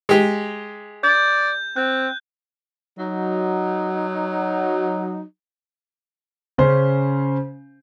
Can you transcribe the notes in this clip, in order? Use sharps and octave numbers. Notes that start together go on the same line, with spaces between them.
G#3 G4
D5 G6
C4 F#6
F#3 D#4
C#3 C#4 C5